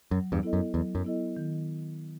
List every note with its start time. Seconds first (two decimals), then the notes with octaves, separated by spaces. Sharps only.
0.11 F#2 F#3
0.32 E2 G2
0.43 B3 E4 A4 D#5
0.53 F#2
0.74 E2 F#3
0.95 F#2
1.05 B3 E4 A4 D#5
1.37 D#3